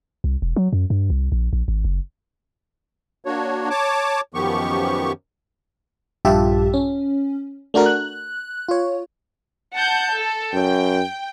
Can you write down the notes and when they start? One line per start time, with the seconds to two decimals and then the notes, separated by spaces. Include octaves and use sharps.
0.24 C2
0.42 E1
0.56 F#3
0.73 F#2
0.90 G2
1.10 C2
1.32 A#1
1.53 A#1
1.68 G#1
1.85 F#1
3.25 A#3 D4 F#4 C#5
3.70 C#5 A5 D6
4.34 F#2 D#3 F3 B3 G4 C#6
6.25 A#1 G2 F4 G4 E5 A5
6.74 C#4
7.74 A3 D4 F#4 A#4
7.86 F#6
8.69 F4 C#5
9.75 F#5 A5 G6
10.13 A4
10.54 F#2 G5